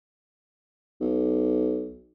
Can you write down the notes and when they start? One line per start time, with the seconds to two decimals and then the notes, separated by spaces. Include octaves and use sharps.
1.01 B1